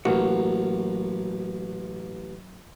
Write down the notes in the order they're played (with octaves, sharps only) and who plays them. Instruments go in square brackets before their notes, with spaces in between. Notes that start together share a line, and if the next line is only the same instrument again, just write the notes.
[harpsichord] A1 [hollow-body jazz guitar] F#3 A#3 F#4